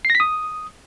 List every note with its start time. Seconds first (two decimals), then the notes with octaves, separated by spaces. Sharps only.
0.05 C7
0.10 A#6
0.15 B6
0.20 D#6